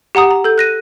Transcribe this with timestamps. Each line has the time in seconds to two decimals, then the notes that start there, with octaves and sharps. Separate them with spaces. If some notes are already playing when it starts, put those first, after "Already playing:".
0.15 G4 F#5 A#5 D#6
0.31 A#5
0.44 A4 G6
0.58 F#6 A#6 D#7